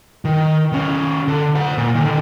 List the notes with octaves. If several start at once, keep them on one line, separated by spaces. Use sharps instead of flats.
D#3
D#3 C#4
D3
C5 F#5
A#2
D3 D#3